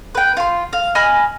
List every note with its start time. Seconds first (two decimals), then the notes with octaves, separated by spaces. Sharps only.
0.15 B4 G5
0.37 F4 C6
0.73 F5
0.95 D#5 G#5 B5 F6